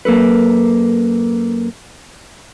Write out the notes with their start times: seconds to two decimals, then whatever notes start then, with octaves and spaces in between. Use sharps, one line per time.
0.05 F#2 A#3 D#4 A4 B4